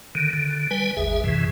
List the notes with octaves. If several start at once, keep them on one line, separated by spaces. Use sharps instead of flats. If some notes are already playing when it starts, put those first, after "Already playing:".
D3 D#3
D3
G3 B4 G#5
G#1 D#2 G#4 E5
F#2 A2 C3 E3